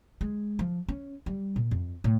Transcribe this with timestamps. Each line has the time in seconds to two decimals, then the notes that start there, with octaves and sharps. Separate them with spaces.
0.21 G#3
0.59 F3
0.88 C#4
1.26 G3
1.56 A#2
1.71 F2
2.04 A2